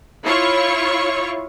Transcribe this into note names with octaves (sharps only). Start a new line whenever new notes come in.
E4 F4 C#5 C#6